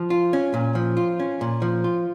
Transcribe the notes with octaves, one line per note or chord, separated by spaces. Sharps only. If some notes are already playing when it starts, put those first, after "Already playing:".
Already playing: F3
F4
C#4
A#2
F3
F4
C#4
A#2
F3
F4